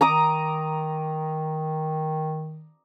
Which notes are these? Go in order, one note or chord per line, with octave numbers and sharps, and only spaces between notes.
D#3 A#5 D6 D#6